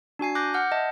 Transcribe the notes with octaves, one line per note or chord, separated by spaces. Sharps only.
D4 F#4 G#5 C7
D6 F#6 G6 A#6
F#5 F6 G6
D#5 E5 A5